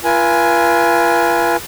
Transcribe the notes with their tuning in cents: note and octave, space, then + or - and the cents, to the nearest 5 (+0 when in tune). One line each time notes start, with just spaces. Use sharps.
F4 -35 B4 -45 G#5 +0